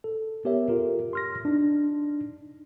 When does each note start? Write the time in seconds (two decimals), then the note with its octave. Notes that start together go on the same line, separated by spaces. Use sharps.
0.04 A4
0.45 B3 G4 A#4 C#5 E5
0.69 F4 G4 A4 A#4
1.13 C6 F6 A#6
1.45 D4 D#4